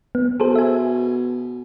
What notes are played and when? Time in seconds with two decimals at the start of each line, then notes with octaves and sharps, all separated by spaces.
0.15 B3
0.40 B2 G#4 A4 C5
0.56 E5 G#5